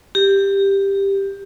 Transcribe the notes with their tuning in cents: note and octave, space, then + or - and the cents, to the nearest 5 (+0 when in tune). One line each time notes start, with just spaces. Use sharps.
G4 +10